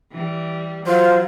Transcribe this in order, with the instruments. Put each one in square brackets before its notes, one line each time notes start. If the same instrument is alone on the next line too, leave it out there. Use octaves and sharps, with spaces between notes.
[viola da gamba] E3 G3
[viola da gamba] F#3 [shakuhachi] F4 [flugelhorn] C5